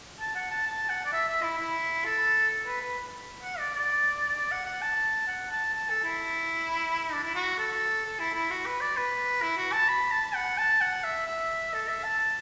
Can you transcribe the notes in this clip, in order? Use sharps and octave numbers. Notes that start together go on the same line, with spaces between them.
A5
F#5
A5
A5
F#5
D5
E5
E5
E4
E4
A4
B4
B4
F#5
D5
D5
D5
F#5
F#5
A5
F#5
A5
A5
A4
E4
D4
E4
F#4
A4
A4
E4
E4
F#4
B4
D5
B4
E4
F#4
A5
B5
A5
F#5
A5
F#5
E5
E5
A4
E5
A5
A5